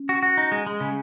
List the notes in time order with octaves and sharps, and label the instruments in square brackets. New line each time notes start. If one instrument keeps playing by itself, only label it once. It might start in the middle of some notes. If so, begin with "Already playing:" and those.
Already playing: [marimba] C#4
[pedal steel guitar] F#4
F#4
D#4
G#3
G#3
C#3